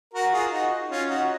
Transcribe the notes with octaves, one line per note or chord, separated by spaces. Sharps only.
F#4 A#4
F4 G#4
D#4 F#4
C#4 F4
D#4 F#4